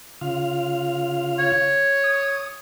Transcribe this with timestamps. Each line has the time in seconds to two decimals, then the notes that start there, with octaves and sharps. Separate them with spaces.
0.21 C#3 F4 F5
1.39 C#5
2.04 D#6